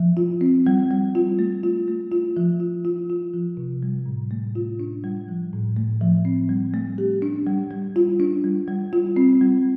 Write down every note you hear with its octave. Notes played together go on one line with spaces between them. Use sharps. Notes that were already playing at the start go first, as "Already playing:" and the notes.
Already playing: F3
F4
C4
G3
G3
F4
A3
F4
A3
F4
F3
F4
F4
F4
F3
C3
G3
A2
A3
F4
D4
G3
F3
A2
A3
F3
C4
G3
A3
G4
D4
G3
G3
F4
D4
G3
G3
F4
C4
G3